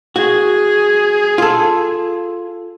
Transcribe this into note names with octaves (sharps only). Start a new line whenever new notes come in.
F#4 G#4
F4 A4